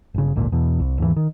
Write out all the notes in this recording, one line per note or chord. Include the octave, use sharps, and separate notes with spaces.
G1 C#3
G#1 D2 A#2
E2 B2
C2
D#2 G#2 C3 E3
D#3